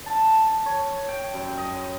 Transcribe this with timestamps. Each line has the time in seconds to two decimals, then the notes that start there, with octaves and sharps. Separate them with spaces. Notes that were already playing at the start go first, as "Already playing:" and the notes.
0.06 A5
0.66 C#5
1.09 G5
1.34 F#2
1.58 D#5